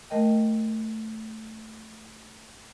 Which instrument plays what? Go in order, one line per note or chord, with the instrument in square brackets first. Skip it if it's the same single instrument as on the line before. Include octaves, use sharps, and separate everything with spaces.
[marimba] A3 A#4 D#5 G5